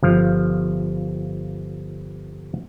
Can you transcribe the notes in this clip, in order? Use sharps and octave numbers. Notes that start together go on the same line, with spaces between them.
G1 F3 F5